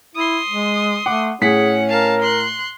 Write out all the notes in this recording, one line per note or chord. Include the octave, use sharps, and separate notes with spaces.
E4 C6 D#6
G#3
A3 F#5 D6
A2 C#4 G#4 F#5 B6
A#4 F5 A5
C6 F#6